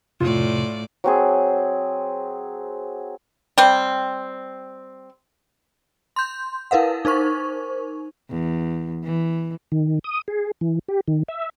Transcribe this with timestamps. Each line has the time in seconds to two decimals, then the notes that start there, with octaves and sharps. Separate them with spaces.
0.21 F2 A2 C3 F4 D5
1.04 F#3 C4 G#4
3.58 G3 C4
6.16 C6 G6
6.71 E4 A#4 B4 F5 F#5
7.05 D#4 A#4 C5 C#6
8.30 E2
9.04 E3
9.72 D#3
10.04 D#6
10.28 G#4
10.61 E3
10.88 G4
11.08 D#3
11.28 E5